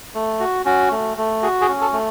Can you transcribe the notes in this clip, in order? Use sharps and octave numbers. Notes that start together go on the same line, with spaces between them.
A3
F#4
C#4 F#4
A3
A3
F#4 G#4
G#4
C#4
A4
A3